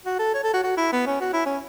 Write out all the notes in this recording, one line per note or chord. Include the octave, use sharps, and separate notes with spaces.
F#4
A4
C#5
A4
F#4
F#4
E4
B3
C#4
F#4
E4
C#4